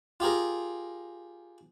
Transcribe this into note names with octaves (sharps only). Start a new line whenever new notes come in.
F4 G4 G#4 A#4